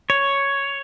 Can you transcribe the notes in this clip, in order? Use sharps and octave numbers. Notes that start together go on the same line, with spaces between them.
C#5